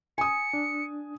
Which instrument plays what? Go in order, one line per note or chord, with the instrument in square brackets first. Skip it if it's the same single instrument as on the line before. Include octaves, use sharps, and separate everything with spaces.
[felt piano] G#5 D#6 [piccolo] C#7
[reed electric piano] D4